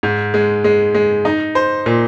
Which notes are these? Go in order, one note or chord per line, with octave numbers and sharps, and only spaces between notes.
G#2
G#3
G#3
G#3
D#4
C5
A#2